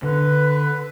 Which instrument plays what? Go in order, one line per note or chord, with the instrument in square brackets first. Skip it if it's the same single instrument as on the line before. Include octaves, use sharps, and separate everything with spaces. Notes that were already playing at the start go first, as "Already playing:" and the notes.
[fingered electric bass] D3 [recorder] B4